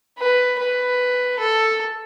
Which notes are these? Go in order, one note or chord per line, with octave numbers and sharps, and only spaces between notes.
B4
B4
A4